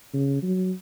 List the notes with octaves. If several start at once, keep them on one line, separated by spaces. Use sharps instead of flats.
C#3
F#3